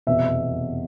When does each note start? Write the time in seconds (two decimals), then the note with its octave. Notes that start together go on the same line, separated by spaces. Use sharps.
0.07 F1 E2 B2 E5